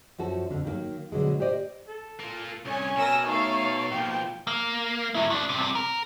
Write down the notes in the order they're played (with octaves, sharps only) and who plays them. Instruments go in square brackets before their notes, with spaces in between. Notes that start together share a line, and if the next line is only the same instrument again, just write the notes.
[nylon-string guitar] F#2 F3 F#4 A4
F2 D3
D#3 F#3 A3 A#3
B2 D3 F#3 G#3
G4 C5 D5 D#5
[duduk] A4
[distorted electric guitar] A#3 F4
[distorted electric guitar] C2 [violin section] C#4 C#5 G#5
[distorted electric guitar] B2 [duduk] A#4 [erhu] G#5 [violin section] E6 A#6
[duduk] A3 [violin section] D#4 A4 F5 [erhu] C#5
[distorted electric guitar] B2 F3 [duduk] A#3 [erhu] G5
[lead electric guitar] A#3
F#3 E4
D#3 D4
G2 C3
A#4